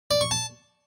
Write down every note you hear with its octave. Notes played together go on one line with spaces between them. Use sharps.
D5
C#6
A5